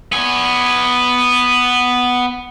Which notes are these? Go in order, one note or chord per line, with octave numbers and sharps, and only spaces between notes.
B3 G#5